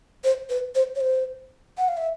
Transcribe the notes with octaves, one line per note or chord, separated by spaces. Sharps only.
C5
B4
C5
C#5
C5
F#5
F5
E5